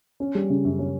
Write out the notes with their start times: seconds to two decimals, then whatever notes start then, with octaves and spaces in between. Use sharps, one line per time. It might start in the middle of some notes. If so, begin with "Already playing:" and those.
0.20 C#4
0.35 G3
0.50 C#3
0.65 F#2
0.79 C#4